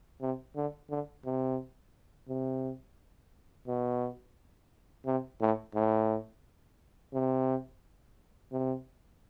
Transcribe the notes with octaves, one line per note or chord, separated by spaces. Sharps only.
C3
D3
D3
C3
C3
B2
C3
A2
A2
C3
C3